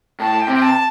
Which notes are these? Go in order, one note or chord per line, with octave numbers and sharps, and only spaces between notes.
A2 A5
G5
C3
G5
A5